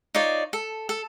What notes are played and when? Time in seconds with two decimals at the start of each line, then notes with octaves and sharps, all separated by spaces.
0.15 D#4 F4 C#5 D5
0.53 A4
0.89 A4